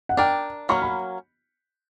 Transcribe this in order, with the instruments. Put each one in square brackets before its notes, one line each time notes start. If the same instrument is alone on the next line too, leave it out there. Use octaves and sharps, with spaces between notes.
[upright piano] F#5
[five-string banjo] D4 A#4 D5 [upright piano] G5
[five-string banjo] F#3 A#3 C#4 [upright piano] C#6
[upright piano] B5